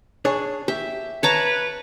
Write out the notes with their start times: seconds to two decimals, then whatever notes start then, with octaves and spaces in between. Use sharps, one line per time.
0.25 D4 G#4 C#5
0.68 G4 E5
1.23 B4 C#5 A5 A#5